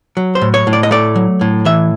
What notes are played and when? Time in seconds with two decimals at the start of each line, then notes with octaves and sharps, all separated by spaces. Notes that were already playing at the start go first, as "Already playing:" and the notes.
0.17 F#3
0.35 C5
0.41 A2
0.54 C#5
0.67 A2
0.73 D5
0.83 D#5
0.91 A3 D5
1.16 F#3
1.41 A2
1.65 E3 E5